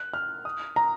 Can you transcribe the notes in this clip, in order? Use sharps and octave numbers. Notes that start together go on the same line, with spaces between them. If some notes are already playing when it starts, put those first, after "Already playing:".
Already playing: F#6
F6
D#6
A#5